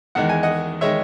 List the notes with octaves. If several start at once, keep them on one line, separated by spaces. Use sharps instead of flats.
E2 D#3 G#3 F#5
G#5
D#5 F#5
D#3 G#3 C#5 E5